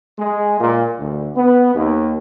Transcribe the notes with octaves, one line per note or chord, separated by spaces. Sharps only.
G#3
A#2
D2
B3
D#2